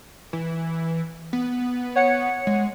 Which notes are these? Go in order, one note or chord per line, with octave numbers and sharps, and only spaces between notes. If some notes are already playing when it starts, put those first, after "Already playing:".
E3
B3
C#5 F#5 C#7
G#3